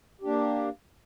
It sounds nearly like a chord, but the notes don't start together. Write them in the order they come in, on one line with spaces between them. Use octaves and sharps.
G4 D4 A#3